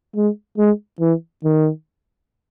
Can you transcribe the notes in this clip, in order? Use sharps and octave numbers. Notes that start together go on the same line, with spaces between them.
G#3
G#3
E3
D#3